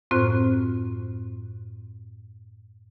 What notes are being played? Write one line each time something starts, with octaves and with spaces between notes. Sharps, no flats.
F#2 A2 C4 F4 C5 F#6